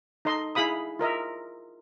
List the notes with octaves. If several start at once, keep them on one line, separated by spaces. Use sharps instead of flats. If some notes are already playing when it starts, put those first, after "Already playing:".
D#4 A4 D#5 C6
E4 G#4 F5 B5 D#6
F4 A#4 D#5 E5